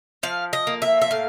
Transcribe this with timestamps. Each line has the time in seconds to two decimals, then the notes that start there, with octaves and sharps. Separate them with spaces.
0.23 F3 F5
0.53 D#5
0.67 A#3
0.82 E5
1.02 E5
1.11 A2 F5